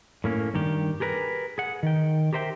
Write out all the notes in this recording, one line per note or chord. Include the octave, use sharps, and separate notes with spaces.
A2 A#3 C#4
G2 D#3 G4
G4 G#4 A#4 B4
G#4 F#5
D#3 G5
G4 A#4 C5 E5 G5